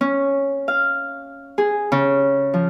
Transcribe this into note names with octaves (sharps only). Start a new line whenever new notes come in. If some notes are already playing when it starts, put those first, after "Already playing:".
C#4
F5
G#4
C#3
F3